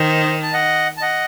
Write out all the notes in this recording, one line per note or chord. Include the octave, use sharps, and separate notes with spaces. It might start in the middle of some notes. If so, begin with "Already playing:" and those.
Already playing: D#3 C5 D#5
A5
D#5 F#5
A5
D#5 F#5